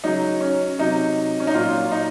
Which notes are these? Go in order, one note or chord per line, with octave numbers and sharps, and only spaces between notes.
C#3 F#3 D#4
C#4
C3 F#3 D#4
C#4
D#4
A#2 F#3 F4
D#4